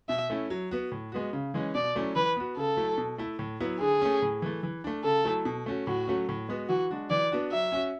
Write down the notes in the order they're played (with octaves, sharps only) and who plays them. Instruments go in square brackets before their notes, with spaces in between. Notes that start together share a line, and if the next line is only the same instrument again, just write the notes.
[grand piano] B2 [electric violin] E5
[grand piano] A3 C#4 E4
F#3
B3 F#4
A2
G#3 B3 F#4
C#3
E3 G#3 C#4
[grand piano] B2 [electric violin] D5
[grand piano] F#3 A3 C#4 E4
[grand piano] E3 [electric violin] B4
[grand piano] B3 F#4
[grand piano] C#3 [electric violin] A4
[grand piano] F#3 A3 E4
B2
A3 E4
A2
F#3 B3 E4
[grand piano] D3 [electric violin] G#4
[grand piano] A3 C#4
A2
E3 A3
E3
A3 D4
[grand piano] C#3 [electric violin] A4
[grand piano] F#3 A3 E4
B2
A3 C#4 F#4
[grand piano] A2 [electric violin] F#4
[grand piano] F#3 A3 C#4
A2
G#3 B3 F#4
[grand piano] E3 [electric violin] F#4
[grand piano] G#3 D4 F#4
[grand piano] E3 [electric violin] D5
[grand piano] B3 D4 F#4
[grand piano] F#3 [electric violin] E5
[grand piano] C#4 F#4